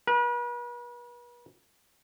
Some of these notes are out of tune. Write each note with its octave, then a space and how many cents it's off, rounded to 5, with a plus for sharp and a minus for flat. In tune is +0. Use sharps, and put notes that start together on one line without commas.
B4 -40